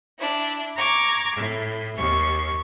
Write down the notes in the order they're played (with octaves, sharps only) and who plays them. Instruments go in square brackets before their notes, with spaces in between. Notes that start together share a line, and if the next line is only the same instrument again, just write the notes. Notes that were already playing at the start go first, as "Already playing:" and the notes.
[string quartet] D4 E4
A#5 C#6 D6 G#6
A2
D#2 C#6